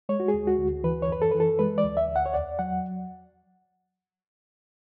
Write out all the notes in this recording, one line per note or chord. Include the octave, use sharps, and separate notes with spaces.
G#3 C#5
F#4
G#4
D2
F#4
D2
E3 B4
C#5
F#2 B4
A4
E3 B4
A4
G#3 B4
D5
D2
E5
D2
F#5
C#5
E2 D5
F#3 F#5